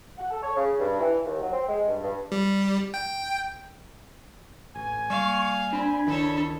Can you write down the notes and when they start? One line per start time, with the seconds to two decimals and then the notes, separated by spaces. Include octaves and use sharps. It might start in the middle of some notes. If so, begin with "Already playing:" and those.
0.18 F#5
0.31 A4
0.42 C#5
0.56 C#3
0.79 G2
1.00 E3
1.24 D#2
1.41 F#3
1.53 C4
1.68 G#3
1.87 G2
2.02 G2
2.32 G3
2.94 G5
4.76 A1 G#5
5.10 G3 G#3 A#3 F5 C#6
5.73 C4 D4 B5
6.07 C#2 D#3 E3 A4 C#5